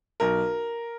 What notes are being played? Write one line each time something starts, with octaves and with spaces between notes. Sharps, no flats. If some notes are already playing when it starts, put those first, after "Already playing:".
B1 A#4